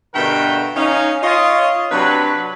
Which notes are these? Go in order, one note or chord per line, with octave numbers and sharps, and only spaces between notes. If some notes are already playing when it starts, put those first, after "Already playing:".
G2 B2 D3 A3 A#4 G5
C#4 D#4 F5
F4 C#5 D#5
C3 F#3 D4 B4